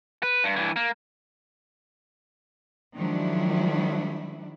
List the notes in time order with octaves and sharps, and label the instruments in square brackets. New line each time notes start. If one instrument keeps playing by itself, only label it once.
[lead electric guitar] B4
G2
G2 E3
A#3
[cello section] D#3 F3 F#3 G#3 D4 E4